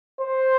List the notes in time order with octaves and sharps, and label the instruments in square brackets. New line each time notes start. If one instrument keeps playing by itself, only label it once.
[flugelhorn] C5